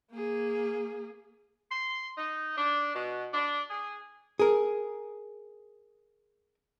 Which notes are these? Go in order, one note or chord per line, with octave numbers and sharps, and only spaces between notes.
A#3 G#4
C6
D#4
D4
B2
D4
G#4
G#4 A#4